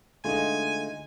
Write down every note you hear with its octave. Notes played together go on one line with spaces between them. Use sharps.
D3 G#3 A3 D#4 F4 G#5